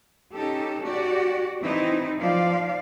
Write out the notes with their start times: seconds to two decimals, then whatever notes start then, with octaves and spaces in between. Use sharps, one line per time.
0.33 C#4 D#4 G4 A4
0.84 F#4 G4 D5
1.62 E3 C4 D#4 E4
2.20 F3 D5 F5